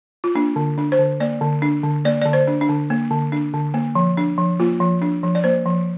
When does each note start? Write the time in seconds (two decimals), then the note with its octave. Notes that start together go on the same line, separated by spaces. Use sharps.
0.24 F4
0.35 A#3 D4
0.56 D3
0.78 D4
0.92 C5
0.99 D3
1.20 A#3 D5
1.41 D3
1.62 D4
1.83 D3
2.05 A#3 D5
2.22 D3 D5
2.33 C5
2.48 D4
2.61 D4
2.69 D3
2.90 A#3
3.11 D3
3.32 D4
3.54 D3
3.74 A#3
3.95 F3
4.17 D4
4.38 F3
4.60 A#3 F4
4.80 F3
5.02 D4
5.23 F3
5.35 D5
5.44 A#3 C5
5.66 F3